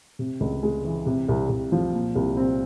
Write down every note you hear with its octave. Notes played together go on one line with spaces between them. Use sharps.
C3
C#2
G#3
E3
C3
C2
C2
F3
A#2
C2
C4